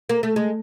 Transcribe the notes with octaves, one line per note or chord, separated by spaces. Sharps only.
A#3
A3
G#3